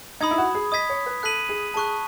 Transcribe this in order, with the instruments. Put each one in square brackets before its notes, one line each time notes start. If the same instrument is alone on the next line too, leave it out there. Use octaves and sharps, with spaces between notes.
[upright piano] D#4 [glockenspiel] B5 D#6 G#6
[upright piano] E4
F#4
G#4
[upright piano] D#5 [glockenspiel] D#6 G#6 B6
[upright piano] C#5
B4
[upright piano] A4 [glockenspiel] F#6 B6 D#7 F#7
[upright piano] G#4
[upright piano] G#4 [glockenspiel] A5 C#6 F#6